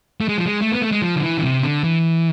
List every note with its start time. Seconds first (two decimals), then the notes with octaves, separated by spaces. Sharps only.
0.21 A3
0.29 G#3
0.38 F3
0.46 G#3
0.62 A3
0.72 B3
0.82 A3
0.92 G#3
1.02 F3
1.16 D3
1.23 E3
1.37 D3
1.43 C3
1.64 D3
1.84 E3